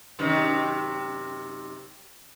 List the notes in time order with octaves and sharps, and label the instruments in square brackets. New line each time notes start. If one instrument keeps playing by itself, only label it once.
[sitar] F#2 C3 D#3